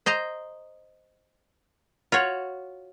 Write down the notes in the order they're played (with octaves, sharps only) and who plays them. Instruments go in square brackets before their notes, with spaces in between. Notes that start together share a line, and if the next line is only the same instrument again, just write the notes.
[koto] C5 D#5 A#5
F4 F#4 C#5